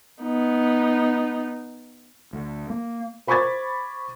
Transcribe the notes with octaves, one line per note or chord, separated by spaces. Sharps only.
B3 D#4
D2
A#3
C5 B5 C#6 D6 G#6 A6